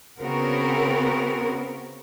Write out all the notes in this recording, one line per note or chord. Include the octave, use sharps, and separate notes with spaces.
C#3 B3 C4 F#4 A#4